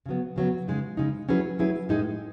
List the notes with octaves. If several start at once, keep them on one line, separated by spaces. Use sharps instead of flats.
C#3 F#3 B3
C#3 F#3 B3
C#3 G#3 D#4
C#3 G#3 D#4
F#3 C#4 E4 G#4 B4
F#3 C#4 E4 G#4 B4
A2 G#3 D#4 G#4